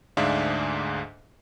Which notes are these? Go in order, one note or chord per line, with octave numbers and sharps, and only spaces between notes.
D2 G#2 D4 G#4 E5 F5